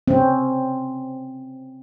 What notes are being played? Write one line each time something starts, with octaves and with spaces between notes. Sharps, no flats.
C4 C#4